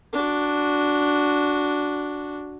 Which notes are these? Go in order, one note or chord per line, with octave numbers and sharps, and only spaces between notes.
D4 F#4